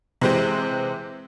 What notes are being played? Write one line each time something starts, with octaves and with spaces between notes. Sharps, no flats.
C3 E3 G#3 C4 G4 C5